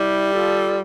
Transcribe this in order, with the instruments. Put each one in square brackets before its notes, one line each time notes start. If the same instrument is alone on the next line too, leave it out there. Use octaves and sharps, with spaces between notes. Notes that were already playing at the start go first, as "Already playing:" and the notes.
Already playing: [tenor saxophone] G3 [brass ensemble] E4 G4
[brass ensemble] F4 A4